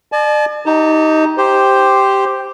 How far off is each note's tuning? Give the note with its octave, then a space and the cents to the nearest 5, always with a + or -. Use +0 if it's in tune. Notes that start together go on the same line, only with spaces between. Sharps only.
D5 +40 A5 -40
D#4 +15 G4 -15 A#5 -45
G4 +0 C5 +0